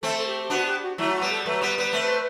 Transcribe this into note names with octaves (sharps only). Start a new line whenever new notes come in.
A3 C4 A4
A4
G4
G4
B3 D4 F#4
G4
F#4
F#3 A3 E4
F#4
G3 B3
A4
F#3 A3 B4
G3 B3
G3 B3
A3 C4